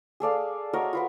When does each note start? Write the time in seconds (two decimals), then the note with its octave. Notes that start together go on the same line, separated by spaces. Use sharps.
0.20 G#4 A4 D5 F5
0.73 F#4 A#4 C#5 D#5
0.93 F4 B4 F#5